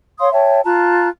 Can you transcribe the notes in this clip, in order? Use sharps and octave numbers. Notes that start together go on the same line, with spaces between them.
C#5 F5 C6 D#6
C#5 E5 G5 A5
F4 A5 A#5 F#6